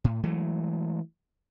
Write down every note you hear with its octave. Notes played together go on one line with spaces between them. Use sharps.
A2
E3 F#3 G#3 A3